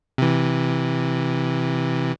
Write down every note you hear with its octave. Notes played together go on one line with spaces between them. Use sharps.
C3 E3